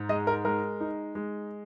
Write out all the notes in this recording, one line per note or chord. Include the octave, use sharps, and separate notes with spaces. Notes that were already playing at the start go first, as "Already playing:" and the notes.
Already playing: G#2
G#3 D#5
A#4
G#3 A#4
D#4
G#3